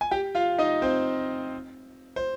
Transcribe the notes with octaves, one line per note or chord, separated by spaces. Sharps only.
G#5
G4 G5
F4 F5
D#4 D#5
C4 C5
C5